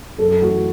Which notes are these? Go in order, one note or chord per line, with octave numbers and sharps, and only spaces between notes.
F#2 A4
E3 A3 F#4